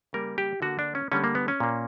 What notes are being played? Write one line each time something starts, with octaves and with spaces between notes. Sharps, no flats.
C#3 G3 A#3 A#4
G4
D3 A#3 F#4
D4
C#4
D3 G3 A#3 C#4
A#3
B3
C#4
A#2 A#3